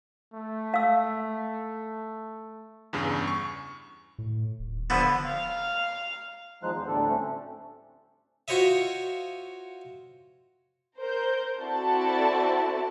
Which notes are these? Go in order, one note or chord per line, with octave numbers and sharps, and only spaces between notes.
A3
F5 E6
E2 G2 C#3
C#6
A2
D#1
D3 F3 B3
F5
E2 F3 G#3 D#4 C5 F#6
E2 C5
D2 A2 G3 D4 A4
A3 C4 C#4
F4 F#4 C5 C#5 D#5 E5
A#4 C5 G6
C4 E4 F#4 A4 D5 A5